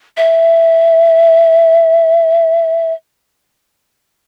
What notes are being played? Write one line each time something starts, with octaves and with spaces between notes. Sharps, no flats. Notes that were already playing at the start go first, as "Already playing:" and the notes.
E5